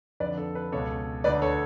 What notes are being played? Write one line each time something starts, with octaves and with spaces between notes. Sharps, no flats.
F2 D3 B4 D5
A4
B4
C#2 B2 A4 C#5
D2 D3 B4 D5
A4 C#5